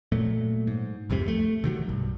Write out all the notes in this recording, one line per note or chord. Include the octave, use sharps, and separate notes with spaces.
A#2 F#3 A3
G#2
C2 F2 G#2 C3
A3
C3 D#3 F#3
B1 G2